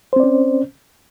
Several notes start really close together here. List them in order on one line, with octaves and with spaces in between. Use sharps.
C5 C4 D5 C#4